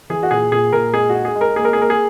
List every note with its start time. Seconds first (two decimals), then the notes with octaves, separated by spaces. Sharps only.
0.10 E3 G#4
0.23 F#4
0.31 A#2 G#4
0.52 A#2 G#4
0.73 A#2 A#4
0.93 G#3 G#4
1.09 F#4
1.15 D#4
1.25 G#4
1.36 G#3
1.41 A#4
1.56 A#3 G#4
1.65 A#4
1.73 G#4
1.77 A#3 A#4
1.90 G#4